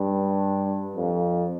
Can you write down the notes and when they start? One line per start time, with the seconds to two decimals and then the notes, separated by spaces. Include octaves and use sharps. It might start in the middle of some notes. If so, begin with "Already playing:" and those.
Already playing: G2
0.96 F2